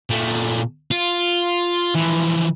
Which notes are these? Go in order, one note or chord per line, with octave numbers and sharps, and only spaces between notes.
A#2 A3
F4
E3 F3